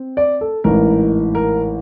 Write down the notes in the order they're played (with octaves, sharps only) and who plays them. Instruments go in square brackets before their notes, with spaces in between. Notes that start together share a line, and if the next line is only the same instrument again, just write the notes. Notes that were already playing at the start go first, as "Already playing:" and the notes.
Already playing: [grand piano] C4
D5
A4
A1 G#2 E3 A#4
A#4